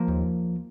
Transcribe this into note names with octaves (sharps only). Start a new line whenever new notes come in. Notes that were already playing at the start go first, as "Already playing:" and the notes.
Already playing: F3 A#3
D#2